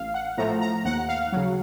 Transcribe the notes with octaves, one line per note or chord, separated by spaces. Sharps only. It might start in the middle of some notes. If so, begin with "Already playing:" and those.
Already playing: A1 F5
F#5
A2 F3 A3 A#5
A#5
D#2 F#5
F5
C#3 F#3